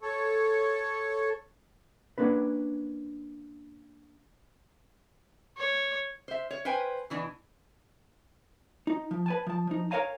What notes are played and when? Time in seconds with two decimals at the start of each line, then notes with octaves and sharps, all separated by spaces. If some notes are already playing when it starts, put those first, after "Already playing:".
0.02 A4 C#5
2.18 A#3 C#4 D4 B4
5.58 C#5
6.28 C5 E5
6.51 C#5
6.65 B4 C5 G5 G#5
7.10 B2 E3 D4
8.87 D#4
9.11 F3
9.26 B4 G#5 A5
9.47 F3 A5
9.67 F3 D#4
9.91 A#4 C5 C#5 F5 G#5 A#5